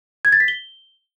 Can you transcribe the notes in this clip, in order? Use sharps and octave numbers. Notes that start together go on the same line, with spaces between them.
G#6
A6
B6
G7